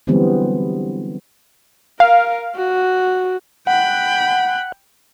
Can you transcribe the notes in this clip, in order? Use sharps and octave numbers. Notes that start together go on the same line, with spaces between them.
D3 E3 F#3 G3 B3 C4
A#4 F5
F#4
F#5 G5 B5